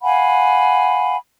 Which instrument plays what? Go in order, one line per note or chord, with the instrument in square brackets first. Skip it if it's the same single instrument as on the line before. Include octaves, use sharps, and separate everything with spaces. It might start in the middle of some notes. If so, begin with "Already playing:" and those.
[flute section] F5 F#5 G#5 B5